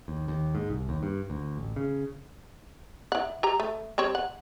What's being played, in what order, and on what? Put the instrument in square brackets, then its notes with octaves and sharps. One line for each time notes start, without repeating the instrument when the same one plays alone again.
[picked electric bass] D#2
D#2
G#2
C2
D#2
G2
D2
A1
C#3
[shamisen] E4 F#5
G4 A#5
A3
G3 C4 C#5
F#5